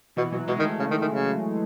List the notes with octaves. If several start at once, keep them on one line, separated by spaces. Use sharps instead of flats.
B2 E3
B2 F#3
B2 G#3
D#3
A3
C#3
D#3
D#3
C#3